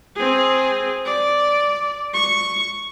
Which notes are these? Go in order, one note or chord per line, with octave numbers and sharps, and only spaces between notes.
C4 G#4
D5
C#6